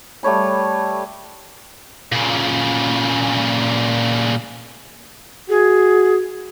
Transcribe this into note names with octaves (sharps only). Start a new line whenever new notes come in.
G3 A3 C#5 B5
A#2 C#3
F#4 G#4